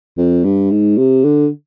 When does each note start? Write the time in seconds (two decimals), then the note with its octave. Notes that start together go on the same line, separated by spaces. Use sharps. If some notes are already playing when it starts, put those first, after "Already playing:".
0.17 F2
0.44 G2
0.71 G#2
0.97 C3
1.24 D3